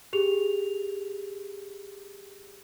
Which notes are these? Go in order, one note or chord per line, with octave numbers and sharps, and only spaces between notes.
G4 G#4 F7